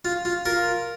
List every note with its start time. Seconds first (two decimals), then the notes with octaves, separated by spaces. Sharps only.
0.05 F4
0.25 F4
0.45 F4 A#4